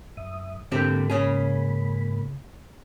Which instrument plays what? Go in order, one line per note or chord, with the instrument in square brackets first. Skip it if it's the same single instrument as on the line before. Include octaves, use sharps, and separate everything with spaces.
[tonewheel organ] F#2 E5 D#6
[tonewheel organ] G#2 A#3 B5 [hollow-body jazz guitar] D3 C4 G4
[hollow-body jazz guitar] C#3 C#4 G#4